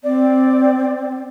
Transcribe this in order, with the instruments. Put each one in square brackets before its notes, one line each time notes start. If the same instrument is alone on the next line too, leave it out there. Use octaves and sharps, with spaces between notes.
[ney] C4 [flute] D5